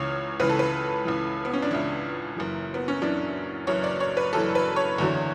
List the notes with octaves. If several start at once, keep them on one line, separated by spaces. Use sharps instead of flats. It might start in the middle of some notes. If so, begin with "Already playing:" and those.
Already playing: C#2 C#3 E3 C#5
C#2 C#3 E3 B4
A4
B4
C#2 C#3 E3
B3
C#4
D4
C#2 C#3 E3 E4
F#1 F#2 E3
B3
C#4
F#1 F#2 E3 D4
F#1 F#2 E3 C#5
D5
C#5
B4
F#1 F#2 E3 A4
B4
C#5
F#1 E2 D3 F#3